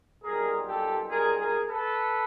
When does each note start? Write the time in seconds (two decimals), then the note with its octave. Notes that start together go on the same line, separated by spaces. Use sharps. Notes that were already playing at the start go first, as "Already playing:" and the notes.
0.23 B1 A#2 G3 G#4 A#4
0.67 G4 A4
1.10 G#4 A#4
1.39 G#4 A#4
1.68 A4 B4